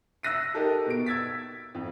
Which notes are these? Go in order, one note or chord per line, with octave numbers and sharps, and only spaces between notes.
E6 F#6 A#6 D#7
D#4 G4 A4 A#4
B2 D7
E6 G#6 A6 B6
F2